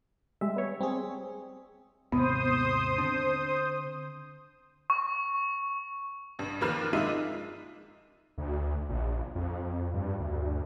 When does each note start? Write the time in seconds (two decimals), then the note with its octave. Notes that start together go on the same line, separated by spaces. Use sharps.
0.41 G3 G#3 E5
0.56 B3 C#5
0.81 G3 C4 G#4
2.12 D#2 G#2 C3 B3 C5 D#6
2.98 D3 C4 D4
4.90 C#6
6.39 A1 G2
6.61 D#2 F3 A#3 B4 F6 E7
6.93 G#3 D4 D#4 F4 E5 D#7
8.38 D2
8.89 A#1
9.35 F2
9.94 G2
10.20 D2